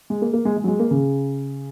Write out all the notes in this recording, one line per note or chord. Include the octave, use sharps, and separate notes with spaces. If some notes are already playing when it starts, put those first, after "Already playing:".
G#3
A#3
A#3
G#3
G#3
F#3
G#3
A#3
C#3